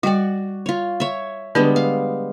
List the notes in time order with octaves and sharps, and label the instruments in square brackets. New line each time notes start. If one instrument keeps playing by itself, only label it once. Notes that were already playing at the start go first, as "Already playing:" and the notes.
[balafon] G3 G5 [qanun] F#4 D5
[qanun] F4 C#5
C#5 E5
[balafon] D3 D4 [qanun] G3 G#3 B3
[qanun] F5